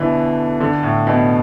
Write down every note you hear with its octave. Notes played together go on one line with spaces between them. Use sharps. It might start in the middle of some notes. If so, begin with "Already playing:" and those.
Already playing: B2 D3 E3
D3
A2
B2